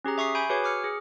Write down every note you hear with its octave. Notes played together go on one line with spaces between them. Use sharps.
C#4 G4 G#4 A#5
E5 C#6 D#6 C7
G#5 B5 G6 D7
F#4 G#4 B4 C#5 G#5 D6
D6 F6 C#7
G#4